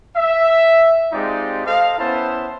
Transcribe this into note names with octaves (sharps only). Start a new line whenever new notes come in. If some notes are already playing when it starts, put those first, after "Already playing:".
E5
G#3 C4 D#4 F4 G4 D5
A4 C5 D#5 F5
B3 C#4 E4 C5 A5